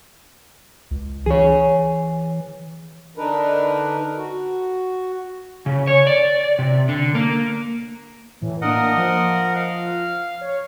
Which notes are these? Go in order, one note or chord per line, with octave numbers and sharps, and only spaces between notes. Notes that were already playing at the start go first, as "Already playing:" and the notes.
C#2
E3 G#4 C#5
D3 D4 D#4 A#4 B4
F#4
C#3
C#5
D5
C3
D3
A#3
A2 E3
A#3 D4 A#4 D#5 F#5 D#6
F3
F5
C#5